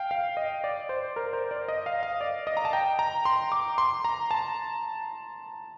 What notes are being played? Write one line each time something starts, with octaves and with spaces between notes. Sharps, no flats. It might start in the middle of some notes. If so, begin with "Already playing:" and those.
Already playing: F5 G5
F5
D#5
D5
C5
A#4
C5
D5
D#5
F5
F5
D5
D#5
A#5
A5
G5
A#5
C6
D6
C6
A#5
A5